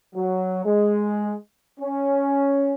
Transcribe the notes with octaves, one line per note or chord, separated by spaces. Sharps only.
F#3
G#3
C#4